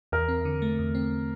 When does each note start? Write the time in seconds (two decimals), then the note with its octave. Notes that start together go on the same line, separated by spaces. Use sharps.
0.12 E2 A#4
0.28 C4
0.45 D3
0.62 A3
0.79 E2
0.95 C4